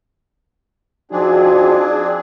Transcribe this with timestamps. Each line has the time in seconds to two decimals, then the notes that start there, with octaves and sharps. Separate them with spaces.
1.11 F3 C4 D4 D#4 F#4 G#4